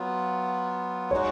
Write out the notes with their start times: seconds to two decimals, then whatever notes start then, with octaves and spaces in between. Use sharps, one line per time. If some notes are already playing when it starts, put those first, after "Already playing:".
Already playing: F#3 B3 F4
1.11 G#3 D#4 F#4 C#5